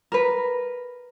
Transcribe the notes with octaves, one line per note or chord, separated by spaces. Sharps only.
A#4 B4